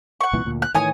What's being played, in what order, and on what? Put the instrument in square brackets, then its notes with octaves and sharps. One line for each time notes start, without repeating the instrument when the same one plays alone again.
[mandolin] F#5 C#6
[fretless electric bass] C2 A#2 E3
D2 A#2
[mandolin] F#6
[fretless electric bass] A2 D#3 E3 [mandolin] C#5 G#5 D#6